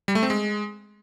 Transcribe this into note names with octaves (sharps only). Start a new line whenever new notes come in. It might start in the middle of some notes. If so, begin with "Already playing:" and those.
G3
A3
C4
G#3